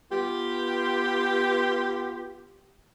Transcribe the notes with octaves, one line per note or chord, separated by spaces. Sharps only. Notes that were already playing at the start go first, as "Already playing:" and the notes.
B3 F4 G4